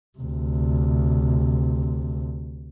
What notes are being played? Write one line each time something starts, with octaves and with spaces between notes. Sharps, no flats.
D2 C3